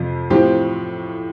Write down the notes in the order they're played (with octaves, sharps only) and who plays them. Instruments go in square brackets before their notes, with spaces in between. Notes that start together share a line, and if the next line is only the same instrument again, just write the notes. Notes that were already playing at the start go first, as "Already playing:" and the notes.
Already playing: [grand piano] F2 C3 F3
A2 F3 C4 G4